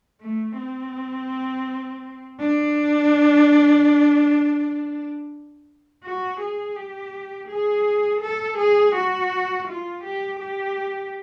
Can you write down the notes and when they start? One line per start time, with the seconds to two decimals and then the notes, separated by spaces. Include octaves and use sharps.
0.21 A3
0.58 C4
2.39 D4
6.04 F#4
6.40 G#4
6.76 G4
7.48 G#4
8.22 A4
8.58 G#4
8.95 F#4
9.67 F4
10.04 G4
10.40 G4